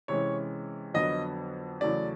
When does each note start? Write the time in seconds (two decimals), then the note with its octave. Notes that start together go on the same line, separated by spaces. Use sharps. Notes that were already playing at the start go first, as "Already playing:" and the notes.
0.08 C3 E3 G#3 C#4 C#5
0.94 F2 D3 F#3 B3 D#5
1.81 E2 C#3 F#3 A3 C#4 D5